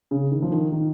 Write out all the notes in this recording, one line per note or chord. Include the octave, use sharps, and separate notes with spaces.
C#3
D#3
F3
D#3
D#3